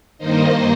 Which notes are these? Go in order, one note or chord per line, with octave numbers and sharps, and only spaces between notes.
G2 D#3 A#3 D#4 C5 D#5